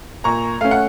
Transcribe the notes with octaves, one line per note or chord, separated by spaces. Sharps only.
A#2 A#5 C#6
A3 C#4 F5
F#5